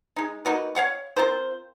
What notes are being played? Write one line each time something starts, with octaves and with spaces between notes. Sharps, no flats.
G#3 D#4
A#3 D#4 F#4 B4
C#5 F5 F#5 C#6
C4 F4 A#4 C5